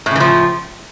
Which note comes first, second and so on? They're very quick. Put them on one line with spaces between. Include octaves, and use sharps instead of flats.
A2 C#3 E3 F3